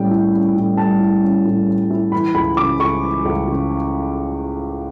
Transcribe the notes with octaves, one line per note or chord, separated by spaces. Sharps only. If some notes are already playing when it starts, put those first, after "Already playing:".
Already playing: A2 G3 C#4 G5
E4
C#4
A2
G3 A5
E4
C#4
A2
G3
E4
E3 B5
C#2 B5
C#3 D6
C#2 C#6
E3
C#2
C#3